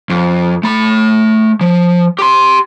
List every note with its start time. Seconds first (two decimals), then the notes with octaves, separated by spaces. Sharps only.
0.10 F2
0.63 A3 B5
1.61 F3
2.19 G4 C6